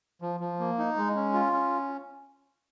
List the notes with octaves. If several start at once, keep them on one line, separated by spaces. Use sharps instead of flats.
F3
F3
A#3
D#4
G#3
C#4
F4
C#4